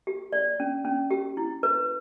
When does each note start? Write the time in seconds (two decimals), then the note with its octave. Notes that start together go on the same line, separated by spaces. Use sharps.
0.07 G4
0.32 D5
0.60 C#4
0.85 C#4
1.11 G4
1.37 E4
1.63 B4